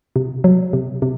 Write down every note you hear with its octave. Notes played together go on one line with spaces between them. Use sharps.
C3
F#3
C3
C3